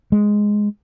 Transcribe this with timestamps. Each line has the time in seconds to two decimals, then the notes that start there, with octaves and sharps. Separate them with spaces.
0.12 G#3